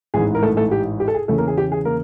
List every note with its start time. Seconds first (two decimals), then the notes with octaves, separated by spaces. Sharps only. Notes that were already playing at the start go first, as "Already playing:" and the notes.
0.14 A1 G#2 E3 G#4
0.35 A#4
0.42 A3 A4
0.57 A3 A4
0.71 G4
1.00 G4
1.08 A4
1.14 G#4
1.28 E2 C#3 E3 A3 A4
1.38 A#3 A#4
1.47 G#4
1.57 G4
1.72 G#4
1.85 A#3 A#4